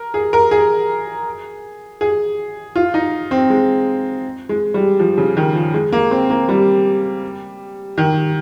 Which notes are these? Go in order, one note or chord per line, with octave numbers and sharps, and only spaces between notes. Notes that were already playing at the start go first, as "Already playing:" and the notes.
Already playing: A#4
G#4
A#4
G#4
G#4
F4
D#4
C4
G#3
G#3
G3
F3
C#3
D#3
F3
G#3
A#3
C4
A#3
G3
D#3